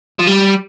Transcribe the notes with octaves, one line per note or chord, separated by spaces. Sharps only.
F3
G3